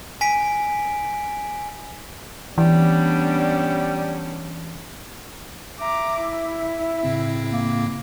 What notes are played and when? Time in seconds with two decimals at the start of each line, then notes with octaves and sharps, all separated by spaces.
0.21 G#5 B6 D7
2.58 E3 G3 B3 C#4 D4
5.80 E5 A#5 D6
6.21 E4
7.03 A2 C#3 C4
7.52 A#3